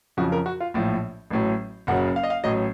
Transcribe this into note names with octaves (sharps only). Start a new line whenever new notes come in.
F2 C#3 F3 F#4
A#4
F#4
F4
A#1 A2 F3
A1 A2 F#3
F#1 F#2 C#3 F#3 F#5
F5
D#5
F5
A1 A2 F#3 D#5